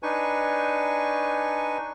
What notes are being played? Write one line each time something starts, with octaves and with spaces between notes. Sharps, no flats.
D4 D#4 B4 G#5 C#6